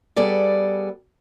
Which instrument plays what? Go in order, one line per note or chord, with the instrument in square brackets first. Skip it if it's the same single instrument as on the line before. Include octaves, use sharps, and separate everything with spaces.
[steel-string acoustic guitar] G3 B3 G#4 A4 D5